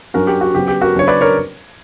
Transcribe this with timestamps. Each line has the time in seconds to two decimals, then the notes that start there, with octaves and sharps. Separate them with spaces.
0.14 G2 F#3 C#4 F#4 A#4
0.27 G4
0.41 F#4
0.54 C#3 F#3 B3 G4
0.68 G4
0.81 F#4 A#4
0.95 C#3 F#3 B3 D4 C#5
1.07 B4 D5
1.21 A#4 C#5